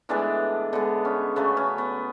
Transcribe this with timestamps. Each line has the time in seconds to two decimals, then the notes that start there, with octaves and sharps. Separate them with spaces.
0.09 A2 E3 G#3 B3 D4
0.73 D3 G#3 B3
1.05 C#4
1.36 C#3 F#3 A3 B3
1.57 C#4
1.78 B3